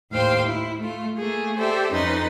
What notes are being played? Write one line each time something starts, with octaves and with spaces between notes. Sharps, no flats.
D#2 A2 C5 F5 G5 C6
E4
A3 F4
A3 A#3 G#4
G4 A4 C5 D5 E5
F2 C#4 D#4 B4 C6 A6